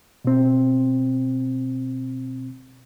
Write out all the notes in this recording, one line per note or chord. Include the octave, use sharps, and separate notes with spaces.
B2 C4